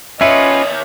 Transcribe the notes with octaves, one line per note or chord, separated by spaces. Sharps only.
D#2 C#4 F4 B4 C#5 D#5 E5